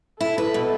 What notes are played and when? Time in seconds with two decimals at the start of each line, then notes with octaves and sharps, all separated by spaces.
0.20 E4 A4
0.38 B4
0.54 B2